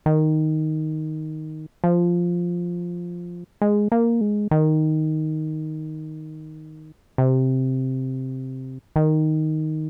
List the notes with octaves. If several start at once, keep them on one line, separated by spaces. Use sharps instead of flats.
D#3
F3
G#3
A#3
G#3
D#3
C3
D#3